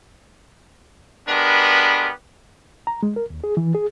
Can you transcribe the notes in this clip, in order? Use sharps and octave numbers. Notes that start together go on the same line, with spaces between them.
G#3 B3 D4 G4 A#4 B4
A#5
G#3
A#4
D#2
G#4
E3
G#4